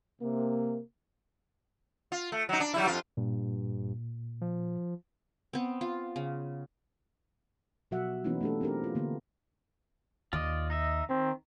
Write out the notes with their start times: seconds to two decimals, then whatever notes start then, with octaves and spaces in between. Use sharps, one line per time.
0.22 C3 A#3
2.12 F4
2.32 A3
2.49 F#3 D#4
2.60 D4
2.74 F#3 G3 E4
2.87 F2 F4
3.17 G2 A#2
4.41 F3
5.53 B3 C4
5.81 F4
6.16 C#3
7.91 B2 F3 F#3 F#4 E5 F#5
8.24 E3 A#3 B3 C#4 D#4 E4
8.41 A3 C#4 D4 G4 A4
8.61 C4 D4 G4 A#4
8.84 F4
8.95 D3 A#3 B3
10.33 D#2 F4 D5 D#5
10.70 D#4 D#5 E5
11.09 D#3 C4